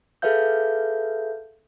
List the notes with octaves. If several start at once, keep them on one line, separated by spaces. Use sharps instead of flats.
G#4 A4 B4 E5 F5 G6